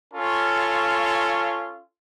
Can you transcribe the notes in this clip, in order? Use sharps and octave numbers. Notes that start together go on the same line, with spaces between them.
C#4 F4 A4